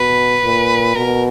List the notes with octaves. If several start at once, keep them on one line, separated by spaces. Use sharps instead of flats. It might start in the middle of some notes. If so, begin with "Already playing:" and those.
Already playing: B2 B4
A#2
B2 A#4